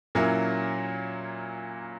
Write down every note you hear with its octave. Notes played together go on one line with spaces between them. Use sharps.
A#2 F#3 A#3 C#4 E4